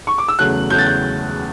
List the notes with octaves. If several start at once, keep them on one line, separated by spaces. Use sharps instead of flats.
C#6
D6
E6
E2 C#3 F#3 A3 F#6
E2 C#3 F#3 A3 G6
A6
G6